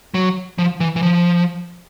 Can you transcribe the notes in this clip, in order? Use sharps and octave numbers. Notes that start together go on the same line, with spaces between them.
F#3
F3
E3
E3
F3